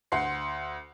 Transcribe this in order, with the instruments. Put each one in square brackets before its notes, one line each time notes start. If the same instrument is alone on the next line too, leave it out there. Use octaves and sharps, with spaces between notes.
[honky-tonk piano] D2 F#5 C6 C7